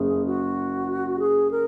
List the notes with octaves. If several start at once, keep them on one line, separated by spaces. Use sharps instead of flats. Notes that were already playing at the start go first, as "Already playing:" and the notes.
Already playing: F#1 G#4
F#4
G#4
A#4